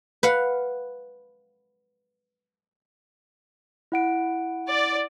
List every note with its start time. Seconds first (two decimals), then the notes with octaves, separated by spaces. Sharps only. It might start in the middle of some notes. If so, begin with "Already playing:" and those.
0.23 B4 F5 F#5
3.92 E4 F#5 D7
4.70 D5